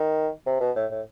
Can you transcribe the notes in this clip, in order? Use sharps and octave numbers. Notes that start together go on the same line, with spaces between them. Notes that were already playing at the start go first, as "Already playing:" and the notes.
Already playing: D#3
C3
B2
A2
A2